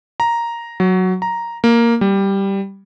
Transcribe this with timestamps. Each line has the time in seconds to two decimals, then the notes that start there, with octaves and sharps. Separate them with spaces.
0.20 A#5
0.80 F#3
1.22 A#5
1.64 A#3
2.01 G3